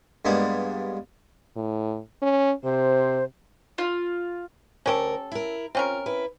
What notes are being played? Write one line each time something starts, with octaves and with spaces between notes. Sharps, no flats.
G2 G#3 A#3 B3
A2
C#4
C3 C5
F4
D2 C#4 G4 A4 A#4
E4 A#4
C4 C#4 F4 A#4
E4 B4